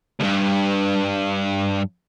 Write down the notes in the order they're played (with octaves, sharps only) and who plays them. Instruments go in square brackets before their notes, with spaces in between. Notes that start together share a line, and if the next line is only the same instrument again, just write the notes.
[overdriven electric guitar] D2 G2